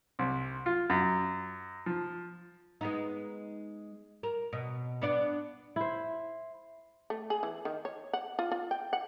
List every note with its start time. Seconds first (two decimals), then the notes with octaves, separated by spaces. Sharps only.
0.19 C2
0.66 F4
0.90 F#2
1.86 F3
2.81 G#3 B3 D#4
4.23 A#4
4.53 B2
5.02 B3 D4 D5
5.76 E4 C5
7.10 A3
7.30 G#4
7.43 E3
7.65 D#3
7.85 C#5
8.13 F#5
8.39 F4
8.52 F4
8.71 G5
8.93 F#5